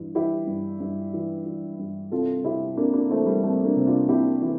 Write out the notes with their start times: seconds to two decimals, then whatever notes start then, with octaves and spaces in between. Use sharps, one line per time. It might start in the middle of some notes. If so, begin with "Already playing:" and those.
Already playing: G2 E3
0.15 E3 E4 G4
0.47 G2
0.80 G2
1.14 E3
1.46 E3
1.79 G2
2.12 C2 F4 A4
2.44 C3 E4 G4
2.77 C2 A#3 D4
2.94 A#3 D4
3.10 E3 A3 C4
3.26 G3 A#3
3.43 C2 A3 C4
3.64 A#3 D4
3.76 C3
3.87 D4 F4
4.09 C2 E4 G4
4.42 E3